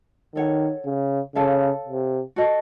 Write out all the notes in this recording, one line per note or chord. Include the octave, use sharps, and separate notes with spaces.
D#3 A4 C#5 F#5
C#3
C#3 A4 C#5 F5 A5
C3
F#4 A4 D#5